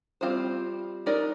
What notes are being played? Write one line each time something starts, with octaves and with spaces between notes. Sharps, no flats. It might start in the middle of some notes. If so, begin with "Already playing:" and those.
G3 C4 F4 C5
G#3 D#4 A#4 D5